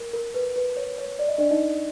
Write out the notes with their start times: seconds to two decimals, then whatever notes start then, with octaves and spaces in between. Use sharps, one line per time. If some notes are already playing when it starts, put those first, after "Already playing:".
Already playing: A#4
0.13 A#4
0.34 B4
0.56 B4
0.77 C#5
0.98 C#5
1.19 D5
1.29 D#5
1.38 D4 D5
1.51 D#4 D#5